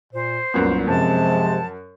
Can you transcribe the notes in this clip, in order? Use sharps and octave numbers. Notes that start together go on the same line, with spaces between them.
A#2 C5
C2 F#2 A#2 B3
F#2 C3 F3 G#3 A5